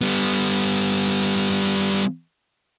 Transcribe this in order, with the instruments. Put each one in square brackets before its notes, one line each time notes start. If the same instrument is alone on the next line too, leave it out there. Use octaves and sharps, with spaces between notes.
[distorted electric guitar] G3 B3